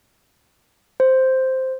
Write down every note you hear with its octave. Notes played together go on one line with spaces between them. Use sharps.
C5